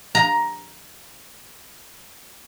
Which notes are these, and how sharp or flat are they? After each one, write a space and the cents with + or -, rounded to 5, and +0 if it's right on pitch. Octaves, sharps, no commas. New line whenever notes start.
A#5 +10